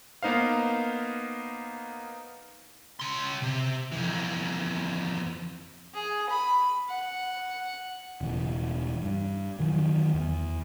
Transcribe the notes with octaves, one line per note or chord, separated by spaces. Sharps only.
A#3 B3 D#4 C5 F5
C#3 C6
C3
F2 E3
G#4
B5
F#5
E1 C#3 E3
G2
F2 D#3 E3 F#3
E2